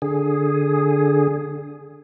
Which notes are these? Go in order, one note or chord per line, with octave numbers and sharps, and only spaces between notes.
D3 G#4